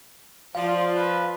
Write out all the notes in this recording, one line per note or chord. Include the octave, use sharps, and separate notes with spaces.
F3 F4 D5 F5
B4